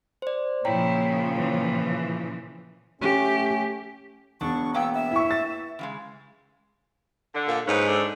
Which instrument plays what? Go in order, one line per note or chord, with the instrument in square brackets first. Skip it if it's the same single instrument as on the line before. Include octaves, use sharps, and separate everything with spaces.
[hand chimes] C5 D5
[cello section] A#2 C#3 F3 [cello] E4 [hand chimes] C#5 G5 A#5
[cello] E3
[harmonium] A3 C#4 [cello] G4
[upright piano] E1 [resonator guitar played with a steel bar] D4 [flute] C#6
[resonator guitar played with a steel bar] A#3 B3 G5 [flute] E6
[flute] E5
[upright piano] E4 C#6
A6
[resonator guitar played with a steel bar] C#3 G3 G#3
[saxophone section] D3
[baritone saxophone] A#2
[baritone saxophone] G#2 [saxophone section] B2 C#4 B4
[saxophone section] D3 D4 A4